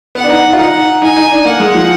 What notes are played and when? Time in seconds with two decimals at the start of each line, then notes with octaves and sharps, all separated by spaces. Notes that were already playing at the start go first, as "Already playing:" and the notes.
0.15 B3 F#5
0.24 D4
0.29 D#4
0.53 F4
0.59 D#4 F#5
1.02 D#4 G#5
1.16 D#4
1.31 D4
1.45 A#3 F#5
1.60 G#3
1.74 F3